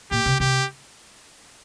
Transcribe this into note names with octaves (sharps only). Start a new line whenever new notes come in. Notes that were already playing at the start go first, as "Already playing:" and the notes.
A#2 G4
C3
C3 G4